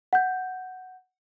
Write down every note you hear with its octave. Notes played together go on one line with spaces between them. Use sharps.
F#5 G6